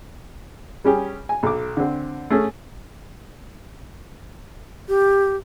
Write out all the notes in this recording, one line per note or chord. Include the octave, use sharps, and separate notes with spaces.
G3 C#4 G4 G#4
G#5
B1 D6
D3 C4
A3 C#4 G#4 A4
G4